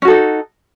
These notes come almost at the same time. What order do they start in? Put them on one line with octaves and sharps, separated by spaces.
C#4 F#4 A4 D#4